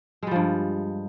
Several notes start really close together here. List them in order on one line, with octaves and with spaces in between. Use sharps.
G#3 G3 F3 G2